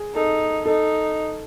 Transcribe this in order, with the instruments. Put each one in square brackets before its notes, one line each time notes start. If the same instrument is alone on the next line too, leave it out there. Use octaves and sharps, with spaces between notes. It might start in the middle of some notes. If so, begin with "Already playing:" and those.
Already playing: [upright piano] G#4
[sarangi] D#4 [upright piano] A4
[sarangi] D#4 [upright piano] A4